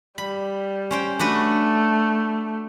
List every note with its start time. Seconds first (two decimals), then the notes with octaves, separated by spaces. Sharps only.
0.18 G3 B5
0.91 C#4 C5 G5
1.19 A3 D4 F#4 B4